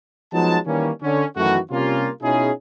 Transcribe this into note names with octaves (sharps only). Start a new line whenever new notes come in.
F3 F#3 G#3 B3 D#4 A5
D#3 E3 G3 A#3 C#4
D3 C#4
F#2 D#3 E3 A3 F#4
C3 G3 A#3 C#4 F4
B2 C#4 D#4 E4 G#4